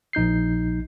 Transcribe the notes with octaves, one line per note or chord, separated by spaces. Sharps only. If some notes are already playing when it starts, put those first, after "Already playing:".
A#1 D#4 G6 C7